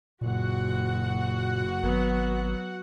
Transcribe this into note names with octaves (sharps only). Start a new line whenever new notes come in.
F#1 A#2 F#4 F#5
G#1 F#3 B3